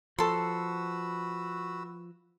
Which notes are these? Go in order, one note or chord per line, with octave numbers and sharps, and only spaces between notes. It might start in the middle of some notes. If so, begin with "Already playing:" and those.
F3 F#4 A4 B4 C6 E6